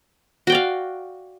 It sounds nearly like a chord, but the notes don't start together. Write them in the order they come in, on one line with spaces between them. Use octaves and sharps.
F#4 G5 D5 F5